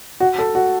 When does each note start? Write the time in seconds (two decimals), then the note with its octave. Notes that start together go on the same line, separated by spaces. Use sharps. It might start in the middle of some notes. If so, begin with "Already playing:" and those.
0.20 F#4
0.39 A4
0.55 F#4